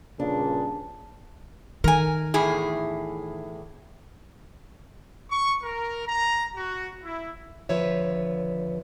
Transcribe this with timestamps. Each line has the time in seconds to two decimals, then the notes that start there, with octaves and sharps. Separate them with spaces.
0.20 G2 A#2 C#3 D4
1.84 D#3 A#4 G#5
2.34 E2 A2 G#4
5.29 C#6
5.61 A#4
6.04 A#5
6.54 F#4
7.03 E4
7.69 D#2 D3 F3 B4 C#5 E5